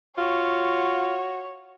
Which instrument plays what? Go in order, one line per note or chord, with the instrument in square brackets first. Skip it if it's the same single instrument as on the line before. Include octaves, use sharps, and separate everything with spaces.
[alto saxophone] F4 [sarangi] F#4 [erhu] C#5